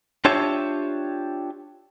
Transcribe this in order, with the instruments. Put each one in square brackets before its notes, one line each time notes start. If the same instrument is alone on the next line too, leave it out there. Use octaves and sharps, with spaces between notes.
[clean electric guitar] D4 F4 G4 C#5 E5 A5